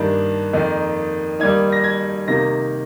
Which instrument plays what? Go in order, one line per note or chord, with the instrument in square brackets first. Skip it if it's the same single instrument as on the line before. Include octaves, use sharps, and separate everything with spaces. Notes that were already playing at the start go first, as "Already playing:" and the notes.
Already playing: [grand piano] G2 D#3 A#3 D4
F2 D#3 A#3 D#4
D#3 G3 A#3 D#4 G#6
A#6
G#6
C3 D#3 A#3 D#4 A#6